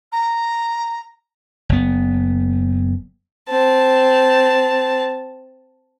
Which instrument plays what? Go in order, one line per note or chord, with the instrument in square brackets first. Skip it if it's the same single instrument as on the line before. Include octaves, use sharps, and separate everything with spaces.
[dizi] A#5
[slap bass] F#1 B3
[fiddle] C4 A5